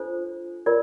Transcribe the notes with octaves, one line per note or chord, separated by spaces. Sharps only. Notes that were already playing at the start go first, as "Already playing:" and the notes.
Already playing: D4 F4 A4 C5
F4 A#4 D5